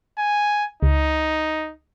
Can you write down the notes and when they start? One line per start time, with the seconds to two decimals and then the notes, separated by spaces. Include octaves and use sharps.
0.18 G#5
0.83 C#2 D#4